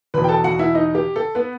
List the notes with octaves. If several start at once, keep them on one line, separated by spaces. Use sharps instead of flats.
E2 B2 B4 B5
G5
A4 A5
F#4 F#5
E4 E5
D#4 D#5
G4
A4
B3 B4